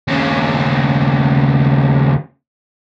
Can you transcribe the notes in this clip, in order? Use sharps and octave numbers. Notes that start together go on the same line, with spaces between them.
D#2 C#3